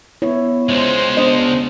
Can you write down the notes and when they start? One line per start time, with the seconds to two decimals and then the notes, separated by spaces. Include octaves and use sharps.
0.22 B3 E4 C#5
0.69 C#2 G#3 C5
1.17 D4 D#5